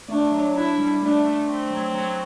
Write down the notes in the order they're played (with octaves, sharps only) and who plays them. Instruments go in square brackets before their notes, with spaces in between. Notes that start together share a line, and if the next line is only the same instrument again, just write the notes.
[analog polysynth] A3 [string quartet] D4
[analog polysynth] F#3
[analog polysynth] D4 [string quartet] E4
[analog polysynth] G3
[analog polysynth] A3 [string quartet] D4
[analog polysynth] A3
[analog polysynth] A3 [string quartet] C4
[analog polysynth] F#3
F#3